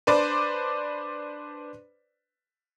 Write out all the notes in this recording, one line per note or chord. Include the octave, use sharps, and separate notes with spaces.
D4 B4 C5 D5 D6